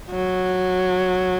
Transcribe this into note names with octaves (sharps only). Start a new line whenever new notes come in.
F#3